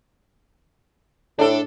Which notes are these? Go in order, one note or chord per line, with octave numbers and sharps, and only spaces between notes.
A2 D4 A4